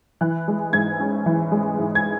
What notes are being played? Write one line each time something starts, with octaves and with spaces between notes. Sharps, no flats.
E3 F#6
G#3
G#2 G#6
C#4
E3
G#3
G#2
G#6